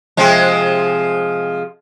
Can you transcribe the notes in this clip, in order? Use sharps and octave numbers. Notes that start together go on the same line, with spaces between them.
C3 F3 G#3